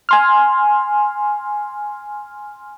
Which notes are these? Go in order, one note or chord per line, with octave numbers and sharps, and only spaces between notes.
G#5 C6 F6